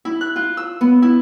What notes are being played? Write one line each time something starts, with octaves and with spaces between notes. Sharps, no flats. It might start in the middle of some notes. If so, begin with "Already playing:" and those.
E4
F#6
F4
E6
B3
E4